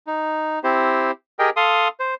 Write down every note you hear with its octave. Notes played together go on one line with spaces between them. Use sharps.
D#4
C4 E4 G4 C5
G4 G#4 A#4 D#5 G5
A4 F5 C6 D#6
C5